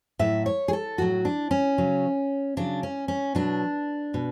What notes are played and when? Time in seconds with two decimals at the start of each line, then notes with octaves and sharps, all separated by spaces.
0.19 A2 F#3 E5
0.46 C#5
0.68 G#4
0.73 A4
0.98 A2 F#3 F#4
1.25 D4
1.51 C#4
1.78 C#3 F#3
2.57 C#3 F#3 D4
2.83 C#4
3.08 C#4
3.35 B2 F#3 D4
4.14 B2